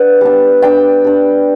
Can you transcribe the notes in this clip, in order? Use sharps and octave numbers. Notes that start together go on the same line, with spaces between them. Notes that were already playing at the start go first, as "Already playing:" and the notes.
Already playing: D4 B4 D5 F#5
G3 B3 D4
G3 D4 G5
G3 D4